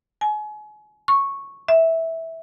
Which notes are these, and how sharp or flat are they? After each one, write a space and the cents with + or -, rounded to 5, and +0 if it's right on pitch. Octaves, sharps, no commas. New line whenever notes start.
G#5 +35
C#6 -10
E5 -10